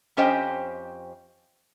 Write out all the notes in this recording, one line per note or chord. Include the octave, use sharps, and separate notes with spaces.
F2 C#4 G4 C5 D#5 G5